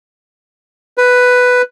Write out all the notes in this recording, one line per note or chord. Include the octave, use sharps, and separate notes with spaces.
B4